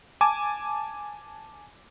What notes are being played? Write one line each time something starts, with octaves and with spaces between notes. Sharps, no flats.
G#5 A5 D6